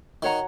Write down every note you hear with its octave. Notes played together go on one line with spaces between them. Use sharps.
D#3 F#4 C#5 F#5 A#5